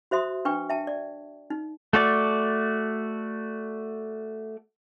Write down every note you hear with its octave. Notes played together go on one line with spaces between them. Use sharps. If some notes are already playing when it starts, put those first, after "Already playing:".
F#4 C5 E5 C6 D#6
D4 B4 G5 C#6
E5 G5 A5
D5
D#4
A3 F#4 D5